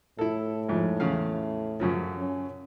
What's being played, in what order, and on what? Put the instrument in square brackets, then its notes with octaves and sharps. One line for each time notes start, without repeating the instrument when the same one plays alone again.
[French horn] A2 [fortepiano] E4 A4
[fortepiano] F2 G#2 F3
E2 C#3 F5
F#2 C#3 F3
[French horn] C#4